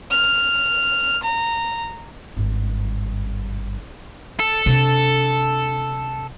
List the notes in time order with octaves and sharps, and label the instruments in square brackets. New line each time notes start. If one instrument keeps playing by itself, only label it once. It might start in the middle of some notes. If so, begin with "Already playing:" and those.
[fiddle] F6
A#5
[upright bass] G#1 G2
[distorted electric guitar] A4
[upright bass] C3 D4